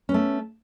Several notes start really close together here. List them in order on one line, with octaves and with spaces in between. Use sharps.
C#4 B3 A3